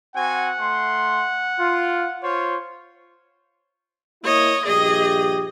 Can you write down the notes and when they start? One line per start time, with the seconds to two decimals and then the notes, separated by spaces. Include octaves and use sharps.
0.15 C4 F#4 F#5 G#5
0.58 A3 C6
1.58 F4
2.22 F4 C5 C#5
4.24 A#3 E4 C#5 D#5
4.66 A#1 G2 G4 G#4 D#5